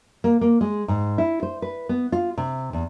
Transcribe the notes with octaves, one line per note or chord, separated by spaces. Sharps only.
A#3
A#3
G#3
G#2
E4
C5
B4
B3
F4
C3
E2